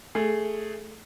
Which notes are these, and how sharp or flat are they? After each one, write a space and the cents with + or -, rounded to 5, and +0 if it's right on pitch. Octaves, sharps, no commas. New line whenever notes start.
A3 +0 G#4 +0